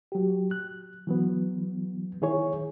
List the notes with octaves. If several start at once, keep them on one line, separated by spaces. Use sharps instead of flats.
F#3 G4
F#6
E3 F#3 B3
D#3 E4 G#4 C#5